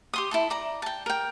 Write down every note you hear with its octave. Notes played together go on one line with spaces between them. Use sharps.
G4 C6 D#6
E4 A4 A5
D5 A#5
G5 A5
A#4 G5